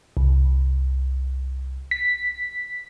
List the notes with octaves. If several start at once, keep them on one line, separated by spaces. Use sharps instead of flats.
C2
B6